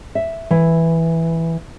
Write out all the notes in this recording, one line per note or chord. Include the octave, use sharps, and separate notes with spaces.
E5
E3